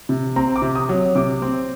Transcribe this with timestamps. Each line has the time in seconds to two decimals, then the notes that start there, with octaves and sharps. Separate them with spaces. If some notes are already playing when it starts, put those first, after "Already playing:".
0.09 C3
0.36 C4 A#5
0.56 D6
0.62 C3
0.75 D#6
0.89 F#3
1.15 C3 D6
1.42 C4